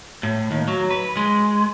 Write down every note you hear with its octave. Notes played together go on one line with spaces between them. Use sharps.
A2
D#2
F#3
B4
G#3